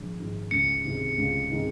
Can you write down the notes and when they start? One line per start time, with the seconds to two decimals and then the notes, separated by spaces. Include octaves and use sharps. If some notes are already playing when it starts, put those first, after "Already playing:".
Already playing: A#1 G#2 D#3 G#3
0.19 G#2 D#3 G#3
0.51 C#2 C#7
0.84 C3 D#3 G#3 D#4
1.18 C#2
1.51 C3 D#3 G#3 D#4